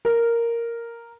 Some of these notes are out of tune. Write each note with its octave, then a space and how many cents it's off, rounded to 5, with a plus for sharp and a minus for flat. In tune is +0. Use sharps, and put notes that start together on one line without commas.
A#4 -5